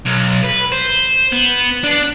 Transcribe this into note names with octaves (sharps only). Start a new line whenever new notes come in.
B1
B4
C5
B3
D4